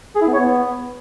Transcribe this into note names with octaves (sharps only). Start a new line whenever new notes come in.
G#4
E4
B3
C#5
B3